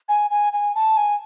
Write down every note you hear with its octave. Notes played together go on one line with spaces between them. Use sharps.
G#5
G#5
G#5
A5
G#5